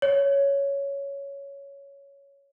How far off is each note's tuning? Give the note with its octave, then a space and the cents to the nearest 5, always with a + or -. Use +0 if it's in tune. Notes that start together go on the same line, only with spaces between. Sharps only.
C#5 +5